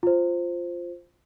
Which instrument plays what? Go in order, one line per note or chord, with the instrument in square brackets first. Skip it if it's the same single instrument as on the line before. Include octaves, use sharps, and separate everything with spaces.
[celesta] F4 C5